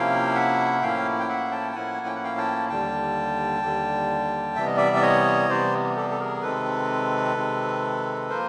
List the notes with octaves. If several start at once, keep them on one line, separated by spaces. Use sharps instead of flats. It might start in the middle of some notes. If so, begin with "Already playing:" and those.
Already playing: C3 F3 A#3 C#4 E4 F5 G5
E5 F#5
A2 F3 A#3 C#4 E4 F5 G5
G5
E5 F#5
G5 A5
A5
A2 F3 A#3 C#4 E4 F#5 G#5
G5
F#5
F5 G5
G5 A5
D#2 D3 G3 G5 A5
D#2 D3 G3
C3 E3 G3 B3 E5
D#5
D5 E5
D5
C#5 D#5
C3 E3 G3 B3 C5 D5
G4 A4
A4
G#4 A#4
C3 D#3 G#3 C4 A4 B4
C3 D#3 G#3 C4
F3 A#3 A#4 C5